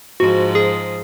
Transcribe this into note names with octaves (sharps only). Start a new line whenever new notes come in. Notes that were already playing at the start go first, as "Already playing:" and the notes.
G#2 F3 F#4
G#4